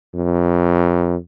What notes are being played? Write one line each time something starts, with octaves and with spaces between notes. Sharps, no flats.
F2